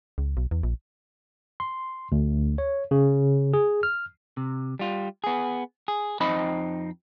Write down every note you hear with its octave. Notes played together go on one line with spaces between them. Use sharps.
C#2
B1
E2
A#1
C6
D2
C#5
C#3
G#4
F6
C3
G3 F4
B3 G#4
G#4
F2 C4 D#4 D#5 B5